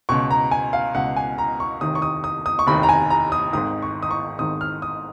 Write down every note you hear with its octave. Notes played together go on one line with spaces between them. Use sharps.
C#2 B2 C#6
A#5
G#5
F5
C#2 B2 F#5
G#5
A#5
C#6
F1 D#2 D#3 D#6
C#6
D#6
D#6
D#6
C#6
F1 D#2 D#3 B5
A#5
G#5
A#5
D#6
G#1 G#2 D#3 D#6
C#6
D#6
C#6
G#1 G#2 D#3 D#6
F6
D#6